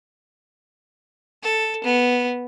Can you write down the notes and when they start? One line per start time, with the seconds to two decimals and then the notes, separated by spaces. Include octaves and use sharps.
1.43 A4
1.84 B3